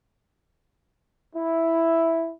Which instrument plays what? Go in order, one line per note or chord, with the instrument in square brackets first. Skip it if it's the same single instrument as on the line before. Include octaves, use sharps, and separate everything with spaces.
[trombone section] E4